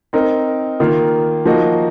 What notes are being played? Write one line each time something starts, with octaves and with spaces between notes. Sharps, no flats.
C4 D#4 A#4
D#3 A#3 F4
F3 A#3 D#4 F#4